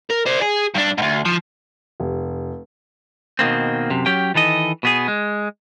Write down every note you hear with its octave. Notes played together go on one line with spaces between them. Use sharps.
A#4
C5 D5
G#4
G2 D4
D2 G#2
F3
F1
B2 D#3 A#3 C4
F#2 C3
F#3 C#4 G4 G5
D#3 E3 A4 D#5
B2 B3 G#4
G#3